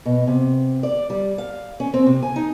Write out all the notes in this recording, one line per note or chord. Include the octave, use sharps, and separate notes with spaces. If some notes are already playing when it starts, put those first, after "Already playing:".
B2
C3
D5
G3
F5
C#4
C4
C3
G#5
D#4